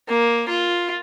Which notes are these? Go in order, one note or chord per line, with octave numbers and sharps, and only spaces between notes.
A#3
F4